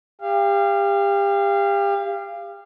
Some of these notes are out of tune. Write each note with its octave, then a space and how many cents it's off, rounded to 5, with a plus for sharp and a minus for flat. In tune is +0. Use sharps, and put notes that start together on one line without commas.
G4 +30 F5 -20